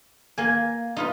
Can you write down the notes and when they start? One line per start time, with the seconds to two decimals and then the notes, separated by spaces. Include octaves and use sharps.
0.38 A#3 G#5
0.52 F5
0.97 D#4 F4 B4